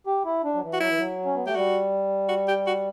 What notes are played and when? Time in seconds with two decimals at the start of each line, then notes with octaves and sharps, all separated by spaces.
0.06 G4
0.25 E4
0.44 D4
0.54 F#3
0.62 E3
0.73 F#4
0.80 F#3 E4
0.89 E3
0.98 F#3
1.25 C#4
1.35 B3
1.45 A3 G4
1.55 G3 F#4
2.29 F#4
2.48 G4
2.67 F#4